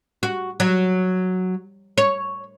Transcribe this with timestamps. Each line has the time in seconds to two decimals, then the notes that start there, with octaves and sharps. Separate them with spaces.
0.23 F#4
0.60 F#3
1.98 C#5